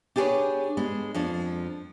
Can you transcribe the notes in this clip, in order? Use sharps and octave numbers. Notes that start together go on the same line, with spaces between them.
D4 G4 G#4 A#4 B4 C#5
G#3 B3 D4
F2 F3 D4